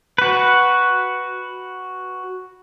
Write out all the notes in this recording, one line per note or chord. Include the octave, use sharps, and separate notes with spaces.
F#4 B4